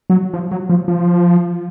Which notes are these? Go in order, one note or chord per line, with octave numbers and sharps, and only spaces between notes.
F#3
F3
F#3
F3
F3